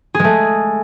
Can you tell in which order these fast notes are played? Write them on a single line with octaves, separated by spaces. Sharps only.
G#4 G#3 A3